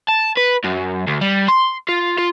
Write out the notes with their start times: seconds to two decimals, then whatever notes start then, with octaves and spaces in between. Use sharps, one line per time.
0.08 A5
0.37 B4
0.64 F#2
1.07 D2
1.21 G3
1.48 C6
1.89 F4
2.18 F4